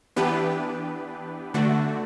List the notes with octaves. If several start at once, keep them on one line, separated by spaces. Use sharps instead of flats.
E3 B3 D4 G4 B4
D3 A3 D4 F#4